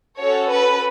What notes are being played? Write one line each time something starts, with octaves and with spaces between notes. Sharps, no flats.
C#4 F#4 A4 C#5
B4